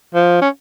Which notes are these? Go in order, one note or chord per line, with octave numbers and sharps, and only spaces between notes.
F3
C#4